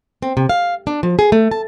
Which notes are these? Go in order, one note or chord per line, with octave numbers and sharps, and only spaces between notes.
C4
C3
F5
D4
F3
G#4
A3
A5